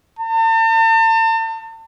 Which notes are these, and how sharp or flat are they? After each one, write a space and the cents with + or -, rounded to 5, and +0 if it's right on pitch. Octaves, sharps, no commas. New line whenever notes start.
A5 +40